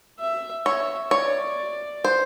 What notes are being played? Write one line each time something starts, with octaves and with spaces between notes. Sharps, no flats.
E5
C#5 E5
C#5 D5
C5